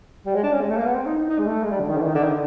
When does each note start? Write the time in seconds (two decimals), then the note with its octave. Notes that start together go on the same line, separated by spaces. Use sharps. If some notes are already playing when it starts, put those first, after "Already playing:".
0.26 G3
0.35 G#3
0.43 D4
0.52 C#4
0.61 G#3
0.70 A3
0.77 A#3
0.86 B3
0.94 C4
1.06 D#4
1.17 D#4
1.30 D#4
1.39 G#3
1.46 A3
1.63 G#3
1.71 G3
1.80 D3
1.90 D#3
1.97 D3
2.02 E3
2.06 D#3
2.15 D3
2.23 D#3
2.32 D3